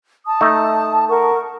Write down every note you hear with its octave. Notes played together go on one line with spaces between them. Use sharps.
A5 D#6
A3 D#4
A#4 F#5 C#6